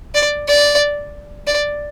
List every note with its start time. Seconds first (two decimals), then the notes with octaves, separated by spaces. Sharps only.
0.15 D5
0.47 D5
1.47 D5